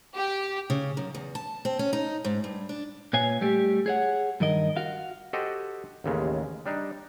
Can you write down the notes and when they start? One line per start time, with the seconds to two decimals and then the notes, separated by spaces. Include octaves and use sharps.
0.15 G4
0.70 C#3
0.97 F#2
1.14 E2
1.35 A5
1.65 C4
1.79 C#4
1.93 D#4
2.25 G#2
2.44 G2
2.69 D4
3.13 A#2 B4 C#5 F5 G#5
3.41 G3 A3 G4
3.86 G#4 C#5 F#5
4.40 G2 D#3 A#4 D#5
4.77 F#4 F5
5.33 F#4 G4 A4 C5 D#5 F#5
6.04 A1 D#2 C#3 G#3
6.66 G3 D4 D#4